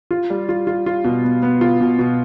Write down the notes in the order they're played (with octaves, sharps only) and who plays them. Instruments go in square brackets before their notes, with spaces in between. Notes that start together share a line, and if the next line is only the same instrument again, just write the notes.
[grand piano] F4
G3
F4
F4
F4
B2
B3
B3
F4
B2
B2